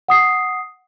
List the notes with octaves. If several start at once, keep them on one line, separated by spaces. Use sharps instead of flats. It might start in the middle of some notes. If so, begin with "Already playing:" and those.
F#5 D#6 C7